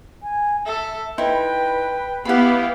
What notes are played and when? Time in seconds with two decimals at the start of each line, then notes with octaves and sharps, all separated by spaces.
0.23 G#5
0.66 A4 E5
1.18 D#4 E4 B4 C5 G5
2.25 B3 E4 G4 F5 F#5 B5